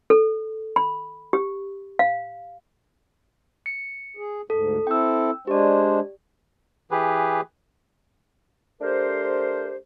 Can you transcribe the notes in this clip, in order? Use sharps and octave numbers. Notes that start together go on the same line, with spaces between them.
A4
B5
G4
F5
C#7
G#4
D2 G#2 A4
C4 E4 A4 G5 E6
G#3 D4 G4 C5 D5
E3 G4 G#4 B4
A3 D4 G4 A#4 C5